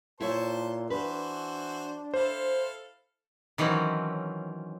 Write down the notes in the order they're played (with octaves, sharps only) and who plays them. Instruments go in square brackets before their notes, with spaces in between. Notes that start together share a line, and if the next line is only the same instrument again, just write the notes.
[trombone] A#2 [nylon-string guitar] E4 C#5 [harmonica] C5 A5 C6
[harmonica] E3 F#4 C5 [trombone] D4 [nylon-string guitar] B4
[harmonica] E4 A4 F5 [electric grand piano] C5
[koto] D#3 E3 F#3 C4 C#4